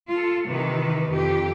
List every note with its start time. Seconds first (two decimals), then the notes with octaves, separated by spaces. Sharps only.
0.11 F4 A4
0.46 C3 D#3 E3 B4
1.11 F2 G4